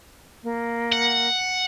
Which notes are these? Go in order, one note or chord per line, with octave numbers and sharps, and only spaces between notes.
A#3
F#5